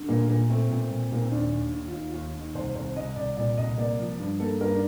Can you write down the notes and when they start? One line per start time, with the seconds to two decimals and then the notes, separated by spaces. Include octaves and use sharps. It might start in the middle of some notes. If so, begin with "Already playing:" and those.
Already playing: D3
0.09 A#2 A#3
0.28 A#2 A#3
0.50 A3 C4
0.70 A#2 C4
0.90 A#2
1.11 A#2 A#3
1.22 C4
1.31 D#2 D4
1.52 D#2
1.73 D#2
1.88 F4
1.93 D#2 D#4
2.09 D#2 F4
2.35 D#2
2.40 D#4
2.54 C2 C5
2.75 C2 C5
2.95 C2 D#5
3.16 C2 D5
3.37 A#2 D5
3.58 C2 D#5
3.78 A#3 D5
3.99 F3
4.19 G2
4.40 A#3 A4
4.61 G2 A#4
4.72 D4